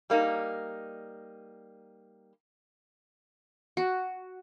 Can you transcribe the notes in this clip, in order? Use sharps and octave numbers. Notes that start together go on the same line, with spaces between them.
G3 A#3 D#4
F#4